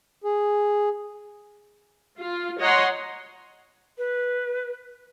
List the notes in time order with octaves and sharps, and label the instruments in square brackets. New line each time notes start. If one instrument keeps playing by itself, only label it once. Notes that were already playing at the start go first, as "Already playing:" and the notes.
[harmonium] G#4
[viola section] F4
C#5 D#5 F#5 A#5 C6
[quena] B4